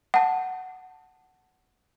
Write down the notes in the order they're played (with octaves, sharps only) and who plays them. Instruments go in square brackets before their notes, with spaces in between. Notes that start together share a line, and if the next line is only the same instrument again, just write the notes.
[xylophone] F#5 A5